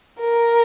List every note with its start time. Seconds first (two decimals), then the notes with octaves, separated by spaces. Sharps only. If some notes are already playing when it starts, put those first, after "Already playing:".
0.20 A#4